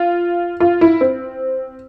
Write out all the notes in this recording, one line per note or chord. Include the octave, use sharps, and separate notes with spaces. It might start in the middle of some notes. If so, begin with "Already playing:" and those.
Already playing: F4
F4
E4
C4